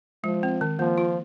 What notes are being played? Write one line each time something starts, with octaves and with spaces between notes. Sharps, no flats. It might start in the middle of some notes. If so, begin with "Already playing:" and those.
F3 G#3
C4
D#3
F3 A#3
F4